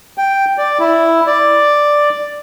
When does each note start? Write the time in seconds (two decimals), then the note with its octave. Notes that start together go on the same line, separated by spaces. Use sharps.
0.18 G5
0.58 D5
0.80 E4
1.27 D5